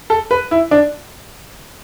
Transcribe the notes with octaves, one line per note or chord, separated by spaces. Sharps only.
A4
B4
E4
D4